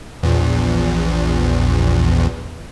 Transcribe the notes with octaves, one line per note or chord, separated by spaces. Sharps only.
A#1 E2